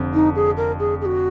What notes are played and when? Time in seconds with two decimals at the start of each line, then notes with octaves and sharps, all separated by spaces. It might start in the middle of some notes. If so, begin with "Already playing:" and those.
Already playing: F1 F2 D3
0.14 D#4
0.35 G#4
0.57 A#4
0.79 G#4
1.01 G#4
1.05 F#4